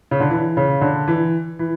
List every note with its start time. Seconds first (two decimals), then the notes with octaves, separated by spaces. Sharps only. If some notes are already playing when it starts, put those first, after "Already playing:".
0.11 C#3
0.20 D3
0.30 E3
0.57 C#3
0.81 D3
1.08 E3
1.59 E3